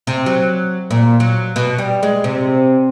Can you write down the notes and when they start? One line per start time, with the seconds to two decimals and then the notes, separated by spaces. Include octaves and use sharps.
0.07 C3
0.26 F#3
0.91 A#2
1.20 F#3
1.56 B2
1.78 G3
2.03 G#3
2.24 C3